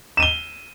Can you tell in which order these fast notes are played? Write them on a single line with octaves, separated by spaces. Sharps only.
E7 D#7 G7